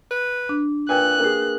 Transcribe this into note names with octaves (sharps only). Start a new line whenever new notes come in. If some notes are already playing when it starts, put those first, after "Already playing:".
B4
D4
A#2 B4 G5 G#5 F#6
A#3 G#4